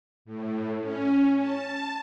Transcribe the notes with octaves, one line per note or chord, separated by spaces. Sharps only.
A2
C#4
A5